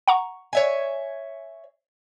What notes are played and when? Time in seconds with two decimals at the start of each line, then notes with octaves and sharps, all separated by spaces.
0.08 F#5 A#5 C#6
0.53 C#5 E5 G#5